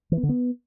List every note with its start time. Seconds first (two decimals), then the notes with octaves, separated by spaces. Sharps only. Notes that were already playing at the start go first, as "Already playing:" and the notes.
0.12 E3
0.17 B3
0.23 D3
0.29 B3